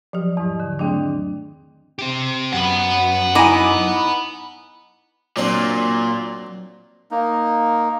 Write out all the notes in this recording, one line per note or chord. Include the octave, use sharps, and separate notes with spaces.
F3 F#3 G4
E2 G#2 F#3
D3
D#3 F#3 A3 C4 D4 G#4
C4 G4
F#2 F#5 B5
D#4 E4 G#5 D6
A#2 F#3 C4 D4
A#3 D#4